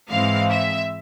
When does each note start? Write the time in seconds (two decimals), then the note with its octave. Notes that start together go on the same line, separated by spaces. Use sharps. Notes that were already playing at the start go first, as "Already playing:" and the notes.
0.11 G#2 E3 G#3 C4 F5
0.50 E5